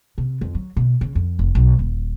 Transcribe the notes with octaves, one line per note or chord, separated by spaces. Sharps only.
C3
F2
F#3
B2
C#3
F2
F1
B1
D#1